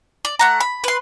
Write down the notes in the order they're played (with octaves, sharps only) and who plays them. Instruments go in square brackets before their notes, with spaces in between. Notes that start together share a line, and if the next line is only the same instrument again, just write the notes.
[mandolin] D5
A3 F#5 A#5
B5
B4 C6